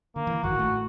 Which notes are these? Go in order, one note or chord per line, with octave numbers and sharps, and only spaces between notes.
D3 A#3
E3
G#1 G2 D#3 F#4
A2 A3